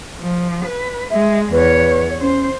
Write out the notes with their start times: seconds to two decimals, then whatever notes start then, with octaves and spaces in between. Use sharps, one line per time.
0.20 F3
0.65 B4
1.11 G#3 E5
1.52 E2 B4 C#5
2.21 C#4 C5